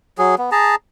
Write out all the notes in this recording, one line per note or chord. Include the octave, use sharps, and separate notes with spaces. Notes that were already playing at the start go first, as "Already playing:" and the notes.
F#3 G#4
B3
G#4 A5 A#5